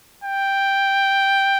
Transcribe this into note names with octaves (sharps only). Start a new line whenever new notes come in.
G5